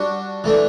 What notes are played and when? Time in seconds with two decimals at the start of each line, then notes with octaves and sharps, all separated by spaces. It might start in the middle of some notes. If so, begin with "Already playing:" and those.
Already playing: G3 D4 F#4
0.44 E3 A3 D4